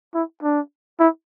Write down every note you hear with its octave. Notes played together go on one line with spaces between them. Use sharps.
E4
D4
E4